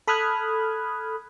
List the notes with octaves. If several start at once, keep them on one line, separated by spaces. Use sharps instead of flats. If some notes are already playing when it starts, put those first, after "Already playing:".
A4 B5 D#6 F6 F#6 G#6